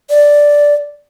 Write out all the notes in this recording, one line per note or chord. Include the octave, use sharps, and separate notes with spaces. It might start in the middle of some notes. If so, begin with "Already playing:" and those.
D5